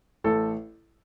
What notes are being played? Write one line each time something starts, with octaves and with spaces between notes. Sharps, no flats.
A1 A4